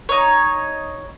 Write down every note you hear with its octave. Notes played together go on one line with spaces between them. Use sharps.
D#4 C#5